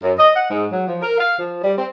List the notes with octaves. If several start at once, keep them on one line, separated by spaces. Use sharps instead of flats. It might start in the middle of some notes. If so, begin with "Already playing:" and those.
F#2
D#5
F#5
G#2
F#3
F3
A#4
F5
F3
G3
C4